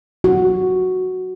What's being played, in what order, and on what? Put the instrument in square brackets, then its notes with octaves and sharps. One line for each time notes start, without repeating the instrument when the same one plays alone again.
[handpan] F#4